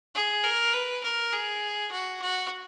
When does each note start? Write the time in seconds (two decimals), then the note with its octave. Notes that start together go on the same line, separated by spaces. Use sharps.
0.15 G#4
0.44 A#4
0.73 B4
1.03 A#4
1.33 G#4
1.91 F#4
2.21 F#4